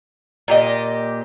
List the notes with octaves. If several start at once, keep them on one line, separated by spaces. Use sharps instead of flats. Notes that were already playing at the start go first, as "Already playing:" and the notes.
A#2 G4 D#5